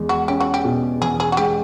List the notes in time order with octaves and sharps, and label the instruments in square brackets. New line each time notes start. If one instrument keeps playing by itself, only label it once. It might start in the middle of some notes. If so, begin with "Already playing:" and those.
Already playing: [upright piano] E2 G#3
[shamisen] F#4
[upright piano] C#4 [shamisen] G4
[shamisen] F#4
G4
[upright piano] B2
[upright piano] E2 [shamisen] G#4
[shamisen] G#4
F#4
[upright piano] G#3 [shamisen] G4